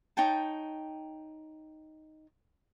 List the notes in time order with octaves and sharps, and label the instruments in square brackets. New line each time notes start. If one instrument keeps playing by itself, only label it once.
[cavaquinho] D#4 C#5 G5 A5